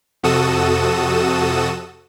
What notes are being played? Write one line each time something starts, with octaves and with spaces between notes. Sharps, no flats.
F2 C3 F#4 A4 D#6 E7